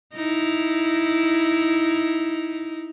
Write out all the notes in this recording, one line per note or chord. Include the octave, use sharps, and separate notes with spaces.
D#4 E4